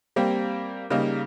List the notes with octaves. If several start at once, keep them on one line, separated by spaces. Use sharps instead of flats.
G3 A#3 C4
C#3 G3 A#3 D#4